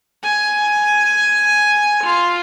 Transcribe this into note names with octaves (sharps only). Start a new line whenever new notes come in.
G#5
F4